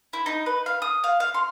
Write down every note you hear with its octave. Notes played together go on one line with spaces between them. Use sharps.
E4
D#4
B4
F5
D#6
F5
F5
C6